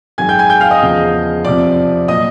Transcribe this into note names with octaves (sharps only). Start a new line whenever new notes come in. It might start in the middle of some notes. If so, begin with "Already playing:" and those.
G#2 D#3 F#3 G#5 G#6
G5 G6
G#5 G#6
G5 G6
F5 F6
D#5 D#6
E2 C#3 F3
F2 C3 F3 D5 D6
A#2 F#3 D#5 D#6